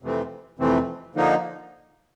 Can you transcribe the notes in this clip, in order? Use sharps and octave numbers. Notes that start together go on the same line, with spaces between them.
F2 C3 E3 A3 C4
F2 C3 E3 A3 C4
D3 F3 A#3 D#4